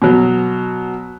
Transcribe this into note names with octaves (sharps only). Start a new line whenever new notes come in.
B2 F#3